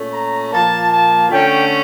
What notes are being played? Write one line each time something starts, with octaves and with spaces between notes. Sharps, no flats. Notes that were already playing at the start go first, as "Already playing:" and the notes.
Already playing: A#2 A3 C#4
A#5
A#2 F3 A#3 A5
A5
D3 A3 C#4 G5